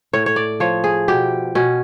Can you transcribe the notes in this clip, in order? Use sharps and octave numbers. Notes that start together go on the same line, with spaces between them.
A2 C#5
C#5
D5
F3 C#5
G#4
B2 G4
B2 C#4